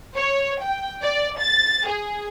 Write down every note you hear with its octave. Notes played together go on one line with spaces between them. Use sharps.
C#5
G5
D5
A6
G#4